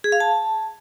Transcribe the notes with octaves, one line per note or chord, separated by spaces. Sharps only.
G#4
F5
A5